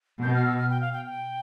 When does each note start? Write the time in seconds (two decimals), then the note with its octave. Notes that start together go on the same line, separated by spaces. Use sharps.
0.23 B2 G6
0.34 F6
0.46 E6
0.58 F6
0.70 G5
0.81 F5
0.93 G5
1.05 G5